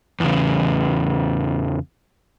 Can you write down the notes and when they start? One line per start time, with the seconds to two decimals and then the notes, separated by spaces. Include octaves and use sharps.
0.20 E2 C#3